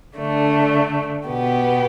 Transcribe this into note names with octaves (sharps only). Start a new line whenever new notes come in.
D3 A3 D4
B2 B3 G4